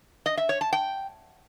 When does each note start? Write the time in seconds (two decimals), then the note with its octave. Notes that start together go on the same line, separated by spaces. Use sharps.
0.26 D#5
0.37 E5
0.49 C#5
0.61 A5
0.73 G5